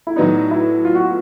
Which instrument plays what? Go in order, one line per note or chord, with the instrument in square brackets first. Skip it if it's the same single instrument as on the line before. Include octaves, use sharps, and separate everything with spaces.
[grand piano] E4
[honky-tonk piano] A2 F#3 B3 D4 [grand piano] D#4
[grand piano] E4
F4
F#4
F4